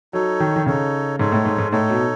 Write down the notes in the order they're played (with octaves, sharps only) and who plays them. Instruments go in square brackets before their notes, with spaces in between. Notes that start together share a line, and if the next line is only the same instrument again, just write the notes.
[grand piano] F#3 [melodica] D#4 A4 C#5
[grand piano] D#3
D#3
[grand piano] C#3 [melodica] D#4 A4 C#5
[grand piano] G#2 [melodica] D#4 A4 C#5
[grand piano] A2
G#2
G#2
[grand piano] A2 [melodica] D#4 A4 C#5
[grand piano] B2